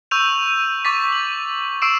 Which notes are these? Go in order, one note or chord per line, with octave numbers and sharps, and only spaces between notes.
C#6 E6 G6 D#7 F7
C#6 D6 A6 B6
F#7
C#6 E6 C7 D7 E7